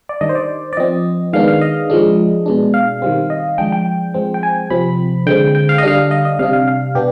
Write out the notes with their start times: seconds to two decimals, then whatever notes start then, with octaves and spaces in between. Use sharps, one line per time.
0.09 D5
0.21 D#3 G3 D4 D#5
0.29 C5
0.35 D5
0.73 D5
0.77 F3 C4 D#5
1.33 D#3 G#3 B3 D4 F5
1.48 F5
1.61 D#5
1.90 F3 G#3 D4
2.46 B2 G#3 D4
2.74 F5
3.02 D#3 G3 C4
3.30 D#5
3.58 F3 G#3 D4 G5
3.72 G5
4.14 F3 G#3 C4
4.34 G5
4.43 G#5
4.70 C3 F3 C4 B5
5.27 D3 G#3 C4 G5
5.55 G5
5.69 F5
5.78 D#5
5.83 D3 G3 D4 F5
6.11 D#5
6.25 D#5
6.39 C3 G3 D4 F5
6.53 F5
6.68 F5
6.95 B2 B3 D4 G4